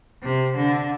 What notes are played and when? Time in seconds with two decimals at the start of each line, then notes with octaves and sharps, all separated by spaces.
0.23 C3
0.57 D3